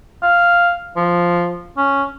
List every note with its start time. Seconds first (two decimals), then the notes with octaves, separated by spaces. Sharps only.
0.23 F5
0.96 F3
1.77 C#4